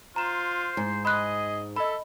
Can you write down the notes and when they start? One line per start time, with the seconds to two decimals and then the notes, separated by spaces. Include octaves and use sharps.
0.16 F4 C5 A#5 E7
0.77 G#2
1.05 G#4 D#5 B5 C6 F#6
1.76 A4 D#5 E5 B5